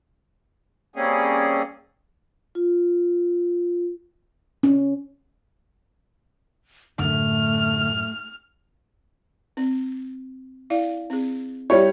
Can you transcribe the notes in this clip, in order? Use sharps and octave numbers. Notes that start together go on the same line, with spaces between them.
G3 A#3 C4 C#4 G#4
F4
C#4
F#2 A2 D3 A3 F6
C4
E4 D5 F5
C4 G#4
G3 E4 C#5 E5 G5